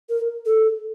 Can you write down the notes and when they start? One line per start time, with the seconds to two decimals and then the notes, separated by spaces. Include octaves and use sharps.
0.09 A#4
0.46 A4